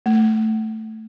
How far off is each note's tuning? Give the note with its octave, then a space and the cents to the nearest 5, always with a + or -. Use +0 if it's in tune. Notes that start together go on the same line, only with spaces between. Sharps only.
A3 +0